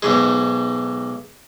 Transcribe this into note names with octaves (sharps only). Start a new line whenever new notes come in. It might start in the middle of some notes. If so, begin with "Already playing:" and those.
B1 G#2 G#3